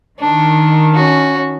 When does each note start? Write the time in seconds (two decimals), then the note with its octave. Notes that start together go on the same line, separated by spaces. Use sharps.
0.20 D#3 D4
0.94 C#4 F#4